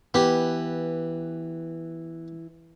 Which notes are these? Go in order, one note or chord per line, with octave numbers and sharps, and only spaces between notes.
E3 B3 G4